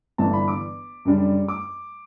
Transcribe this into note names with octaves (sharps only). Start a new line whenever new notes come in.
G1 G2 E3 A5
B5
D6
F#2 C#3 G3 D4
D6